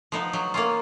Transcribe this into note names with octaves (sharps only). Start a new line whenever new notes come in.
F3 B3 D#4
F#3
A#3 C#4 F4